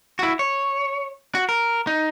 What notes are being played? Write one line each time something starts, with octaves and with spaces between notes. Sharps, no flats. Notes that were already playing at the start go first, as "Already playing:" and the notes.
E4 F#4
C#5
F#4
A#4
D#4